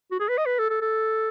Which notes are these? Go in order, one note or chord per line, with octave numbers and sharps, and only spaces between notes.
F#4
G#4
B4
D#5
B4
A4
A4
A4